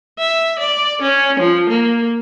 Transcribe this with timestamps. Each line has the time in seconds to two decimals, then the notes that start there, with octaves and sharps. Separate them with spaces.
0.18 E5
0.59 D5
1.02 C#4
1.40 F3
1.69 A#3